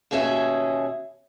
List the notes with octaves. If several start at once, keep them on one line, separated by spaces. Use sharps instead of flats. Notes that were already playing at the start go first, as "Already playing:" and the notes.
D#2 B2 C#4 G#4 E5